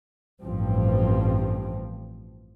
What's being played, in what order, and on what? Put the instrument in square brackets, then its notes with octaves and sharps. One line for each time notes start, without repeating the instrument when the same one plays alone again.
[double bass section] A1 G2 F3 C4